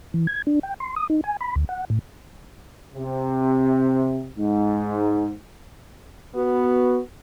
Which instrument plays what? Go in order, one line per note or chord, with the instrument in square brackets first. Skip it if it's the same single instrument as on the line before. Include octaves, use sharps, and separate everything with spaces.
[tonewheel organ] E3
G#6
D4
G5
C6
D#6
D#4
G#5
B5
D2
F#5
A2
[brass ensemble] C3
G#2
[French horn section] B3 F#4